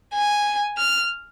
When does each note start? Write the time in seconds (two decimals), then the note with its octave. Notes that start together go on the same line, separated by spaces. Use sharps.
0.14 G#5
0.78 F6